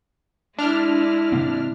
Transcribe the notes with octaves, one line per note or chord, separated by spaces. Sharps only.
G#3 D4 E4 F6
C3 A#3 C4